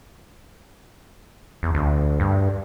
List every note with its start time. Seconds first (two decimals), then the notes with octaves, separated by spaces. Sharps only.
1.63 E2
1.75 D2
2.20 G2